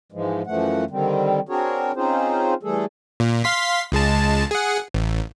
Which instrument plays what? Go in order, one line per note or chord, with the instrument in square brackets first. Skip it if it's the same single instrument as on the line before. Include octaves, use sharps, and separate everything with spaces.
[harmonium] G#2 E3 F3 G#3
F#2 E3 F3 A3 F#5
D3 D#3 G3 C4
C4 D4 F#4 G#4 A#4 C#5
C4 C#4 D#4 F4 G#4 C5
E3 G3 A3 G#4 A4
[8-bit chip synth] A#2
F5 C6 B6
C#2 G#3 A5
G#4 F#5
A1